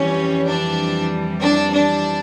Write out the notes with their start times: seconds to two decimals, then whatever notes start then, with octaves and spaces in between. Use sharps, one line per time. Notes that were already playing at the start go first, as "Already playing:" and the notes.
Already playing: F2 E3 G3 C#4
0.46 D4
1.41 D4
1.73 D4